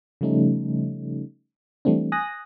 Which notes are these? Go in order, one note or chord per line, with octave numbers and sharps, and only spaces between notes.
C#3 F3 G3 A3 C#4 D#4
E3 G3 A3 C4 D4
G#5 D#6 F#6 A#6